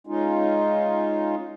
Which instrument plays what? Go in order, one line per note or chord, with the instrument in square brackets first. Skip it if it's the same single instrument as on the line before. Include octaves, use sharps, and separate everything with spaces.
[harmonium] G#3 C#4 D#4 F4